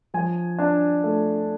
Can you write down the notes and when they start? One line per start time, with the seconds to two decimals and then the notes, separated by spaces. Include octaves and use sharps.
0.14 F3 G#5
0.59 D4 A5
1.04 A3